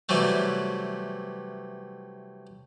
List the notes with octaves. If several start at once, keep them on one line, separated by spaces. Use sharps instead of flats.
C3 E3 F#3 G3 A3